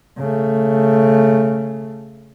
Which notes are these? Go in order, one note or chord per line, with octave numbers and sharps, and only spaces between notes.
C#3 A3